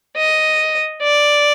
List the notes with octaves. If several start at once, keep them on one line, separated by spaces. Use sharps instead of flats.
D#5
D5